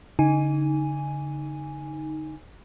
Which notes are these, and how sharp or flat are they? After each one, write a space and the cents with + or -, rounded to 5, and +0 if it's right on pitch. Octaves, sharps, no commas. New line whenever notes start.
D3 -40 D#4 +5 G#5 -5